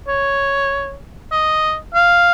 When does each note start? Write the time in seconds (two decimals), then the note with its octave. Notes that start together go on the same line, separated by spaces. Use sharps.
0.08 C#5
1.32 D#5
1.94 F5